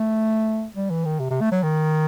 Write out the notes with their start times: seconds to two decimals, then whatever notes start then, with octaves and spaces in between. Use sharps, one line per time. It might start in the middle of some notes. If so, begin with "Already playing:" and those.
Already playing: A3
0.75 G3
0.90 E3
1.05 D#3
1.20 C3
1.30 C3
1.41 A3
1.52 F#3
1.63 D#3